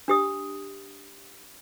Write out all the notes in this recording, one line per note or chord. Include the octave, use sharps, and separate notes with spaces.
D4 G4 D#6